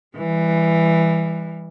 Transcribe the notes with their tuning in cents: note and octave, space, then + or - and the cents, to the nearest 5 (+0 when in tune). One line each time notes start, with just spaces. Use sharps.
E3 +0 G3 +30